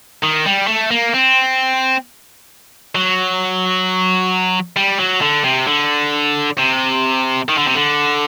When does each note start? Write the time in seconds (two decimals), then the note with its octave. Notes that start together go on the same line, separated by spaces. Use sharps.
0.23 D#3
0.46 G3
0.68 A3
0.91 A#3
1.14 C4
2.95 F#3
4.77 G3
4.99 F#3
5.22 D3
5.44 C3
5.67 D3
6.58 C3
7.48 D#3
7.57 D3
7.66 C3
7.75 D3